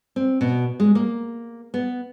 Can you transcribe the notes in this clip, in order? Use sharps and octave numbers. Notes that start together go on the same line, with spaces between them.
C4
B2
G#3
A#3
B3